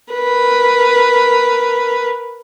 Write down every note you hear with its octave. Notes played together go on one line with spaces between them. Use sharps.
A#4 B4